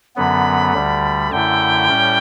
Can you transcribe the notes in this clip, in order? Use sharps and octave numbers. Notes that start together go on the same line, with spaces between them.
F#2 D3 F#3 B3 B5
D2 D3 G3
F#2 D3 A3 E4 G5
A2 G3 C#4